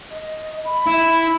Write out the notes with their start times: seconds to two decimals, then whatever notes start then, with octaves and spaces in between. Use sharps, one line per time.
0.11 D#5
0.65 B5
0.87 E4